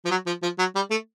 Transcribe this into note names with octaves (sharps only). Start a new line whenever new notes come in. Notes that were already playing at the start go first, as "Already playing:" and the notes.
F3
F#3
F3
F3
F#3
G3
A3